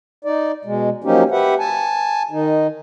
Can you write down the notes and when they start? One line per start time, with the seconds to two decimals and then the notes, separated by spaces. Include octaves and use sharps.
0.25 D#4 D5
0.65 B2 G#3
1.04 F3 F#3 A#3 C#4 D#4 G4
1.31 G4 B4 E5 F#5
1.59 G#5 A5
2.31 D#3 D#4